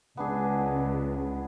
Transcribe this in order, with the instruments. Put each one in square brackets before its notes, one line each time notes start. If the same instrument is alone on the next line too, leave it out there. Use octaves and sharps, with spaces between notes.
[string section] C#2 [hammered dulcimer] B3 D4 G#4